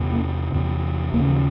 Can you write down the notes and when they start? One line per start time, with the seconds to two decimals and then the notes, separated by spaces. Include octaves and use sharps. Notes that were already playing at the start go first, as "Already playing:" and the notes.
Already playing: E2 C3
0.13 A#3
0.53 E2 C3
1.13 D#2 A#3
1.18 C#3
1.29 F3